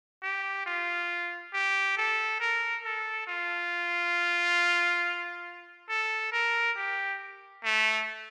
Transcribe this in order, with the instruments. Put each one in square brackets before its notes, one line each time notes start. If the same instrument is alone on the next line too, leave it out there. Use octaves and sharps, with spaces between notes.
[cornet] G4
F4
G4
A4
A#4
A4
F4
A4
A#4
G4
A3